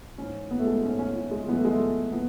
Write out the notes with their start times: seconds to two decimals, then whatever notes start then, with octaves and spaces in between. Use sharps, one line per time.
0.18 G#2 E3 C#4
0.51 B3
0.59 A3
0.66 G#3
0.74 A3
0.83 G#2 C#4
0.87 E3
0.99 C#4
1.16 E4
1.31 G#3
1.48 E3 B3
1.52 F#2 A3
1.65 G#3
1.73 A3
2.12 E3 B3